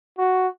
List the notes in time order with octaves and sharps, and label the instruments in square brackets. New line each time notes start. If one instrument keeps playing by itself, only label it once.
[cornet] F#4